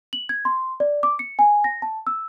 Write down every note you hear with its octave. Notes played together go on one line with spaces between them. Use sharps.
F#7
G#6
C6
D5
D6
C#7
G#5
A#6
A5
E6